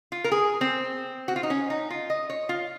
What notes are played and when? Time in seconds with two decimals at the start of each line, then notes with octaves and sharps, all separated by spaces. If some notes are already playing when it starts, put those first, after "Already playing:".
0.12 F4
0.24 A#4
0.32 G#4
0.61 C4
1.28 F#4
1.36 F4
1.43 D#4
1.50 C#4
1.70 D#4
1.90 F4
2.10 D#5
2.30 C#5
2.49 F4